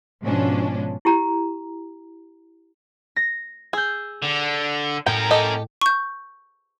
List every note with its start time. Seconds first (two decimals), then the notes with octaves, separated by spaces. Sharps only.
0.22 G#2 B2 F3 C#4 D4
1.05 E4 G4 A#5
3.16 A#6
3.73 G#4 E6 G6
4.22 D3
5.06 A2 C#4 A#4 G5
5.31 G4 A4 D#5
5.81 C#6 G6